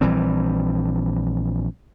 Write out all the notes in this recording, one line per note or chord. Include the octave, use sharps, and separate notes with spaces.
A#1 E3 G3 C4